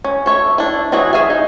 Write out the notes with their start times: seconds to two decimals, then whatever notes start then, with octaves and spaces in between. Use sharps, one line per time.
0.04 C#4
0.26 A4 C#5 E5
0.58 D4 E4
0.92 E3 F#3 E4 F#4 G#4
1.13 G#4 E5 F5 G#5
1.30 D#4